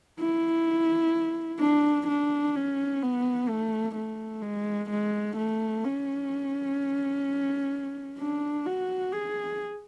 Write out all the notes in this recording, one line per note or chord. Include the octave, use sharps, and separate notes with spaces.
E4
D4
D4
C#4
B3
A3
A3
G#3
G#3
A3
C#4
D4
F#4
G#4